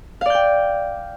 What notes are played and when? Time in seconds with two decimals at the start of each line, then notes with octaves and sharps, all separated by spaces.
0.21 F5
0.26 D5
0.30 G6
0.34 G5